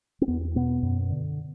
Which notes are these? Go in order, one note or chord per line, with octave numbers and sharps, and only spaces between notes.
C4
E2 B3
B2 B3
F#2
D3